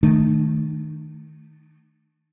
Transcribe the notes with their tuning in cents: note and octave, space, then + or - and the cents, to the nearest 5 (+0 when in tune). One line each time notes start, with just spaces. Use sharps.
D#3 -5 A3 -10 D4 +45